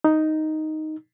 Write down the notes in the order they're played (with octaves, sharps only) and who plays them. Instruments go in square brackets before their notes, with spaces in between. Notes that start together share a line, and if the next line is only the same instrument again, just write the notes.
[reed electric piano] D#4